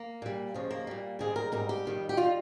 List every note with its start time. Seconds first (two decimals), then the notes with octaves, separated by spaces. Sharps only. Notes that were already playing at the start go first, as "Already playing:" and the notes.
Already playing: A#3
0.22 A#2 G3
0.54 D#2 C#3 F3
0.71 A#3
0.87 A#2 G3
1.19 G#2 D#3 G3 G#4
1.36 A#4
1.52 G#2 G3 A#4
1.69 G4
1.85 F2 D#3 G3
2.09 G4
2.17 D#3 G3 F4